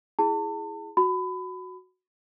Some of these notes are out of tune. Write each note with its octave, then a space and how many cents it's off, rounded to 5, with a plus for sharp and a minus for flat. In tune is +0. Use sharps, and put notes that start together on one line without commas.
E4 +10 G#4 +0 A5 +35
F#4 -5 B5 +25